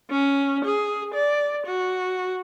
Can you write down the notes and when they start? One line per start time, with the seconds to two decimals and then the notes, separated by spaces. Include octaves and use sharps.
0.10 C#4
0.64 G#4
1.14 D5
1.66 F#4